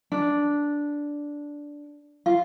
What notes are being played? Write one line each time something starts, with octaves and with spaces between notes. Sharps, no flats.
D4
F4